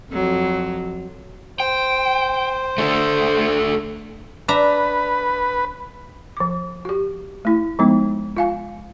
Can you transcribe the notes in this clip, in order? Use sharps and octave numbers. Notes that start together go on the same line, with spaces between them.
F2 F#3
C5 G5
A3 D4 A4
D4 B4 E5 A#5
F3 D6
F#4 G4
A3 E4
F3 G#3 B3 D#4
F4 F5 G#5